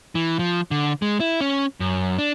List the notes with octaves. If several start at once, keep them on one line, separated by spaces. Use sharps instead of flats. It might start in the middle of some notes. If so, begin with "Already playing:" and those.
E3
F3
D3
G#3
E4
C#4
F#2
D4